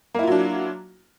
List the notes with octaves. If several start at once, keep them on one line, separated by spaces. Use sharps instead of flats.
F#3 A#3 D4 E4 F4